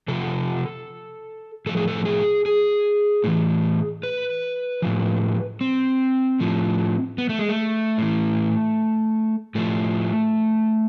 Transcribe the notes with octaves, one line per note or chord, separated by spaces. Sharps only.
C3 F3 A4
A2 F3 A4
G#4
A4
G#4
G#4
A2 E3
B4
A2 F3
C4
A2 F3
B3
A3
G#3
A3
A2 E3
A2 F3 A3